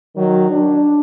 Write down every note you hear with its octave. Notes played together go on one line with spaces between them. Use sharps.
D#3 F#3
D4